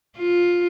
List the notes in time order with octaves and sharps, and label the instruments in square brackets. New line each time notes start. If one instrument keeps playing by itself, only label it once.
[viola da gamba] F4